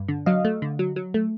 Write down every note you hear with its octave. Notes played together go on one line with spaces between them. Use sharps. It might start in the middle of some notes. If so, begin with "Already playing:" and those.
Already playing: G2
D3
F#3 D#5 F5
A3
D3
F#3
F#3
A3